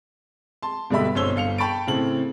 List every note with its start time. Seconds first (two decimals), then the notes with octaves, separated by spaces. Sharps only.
0.63 A5 C6
0.90 G2 B2 D3 G4 E5 B5
1.15 G1 B2 C5 C#5 E6 G7
1.36 G1 F5 C#7 F7
1.58 G5 A5 B5 C#6 A6 D7
1.87 A2 C#3 C4 A4 F#7